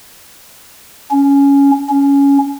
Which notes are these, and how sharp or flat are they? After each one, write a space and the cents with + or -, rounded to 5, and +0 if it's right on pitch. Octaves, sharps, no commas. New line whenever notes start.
C#4 +10
C#4 +10